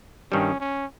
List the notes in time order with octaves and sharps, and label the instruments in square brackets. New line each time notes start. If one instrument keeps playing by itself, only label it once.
[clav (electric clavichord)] G2 D#3 G3 [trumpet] C#4
[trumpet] C#4